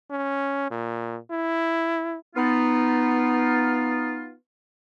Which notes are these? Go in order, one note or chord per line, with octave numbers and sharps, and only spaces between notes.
C#4
A#2
E4
B3 D#4 F4